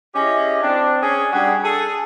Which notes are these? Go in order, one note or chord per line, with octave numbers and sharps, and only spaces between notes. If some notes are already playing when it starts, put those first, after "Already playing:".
C#4 E4 G4 G#4 D#5
C4 D4
C#4 G#4
G3 D4 F#4 G#4
G#4 A4